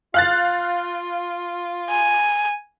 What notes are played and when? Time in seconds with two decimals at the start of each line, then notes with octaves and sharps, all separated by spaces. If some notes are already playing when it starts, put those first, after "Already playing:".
0.14 F4 F5 F#6 A6
1.90 G#5